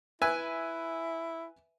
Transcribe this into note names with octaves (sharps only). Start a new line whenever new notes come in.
E4 B4 E5 G#5